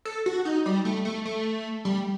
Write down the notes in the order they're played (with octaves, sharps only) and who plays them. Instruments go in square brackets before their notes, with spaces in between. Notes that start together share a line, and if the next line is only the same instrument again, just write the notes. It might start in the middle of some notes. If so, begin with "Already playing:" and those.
[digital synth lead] A4
F#4
D#4
G3
A3
A3
A3
G3